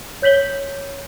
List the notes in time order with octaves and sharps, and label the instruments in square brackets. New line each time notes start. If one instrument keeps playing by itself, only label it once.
[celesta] C#5 G6 B6 F#7 G7